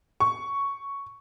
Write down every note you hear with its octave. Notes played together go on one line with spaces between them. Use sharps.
C#6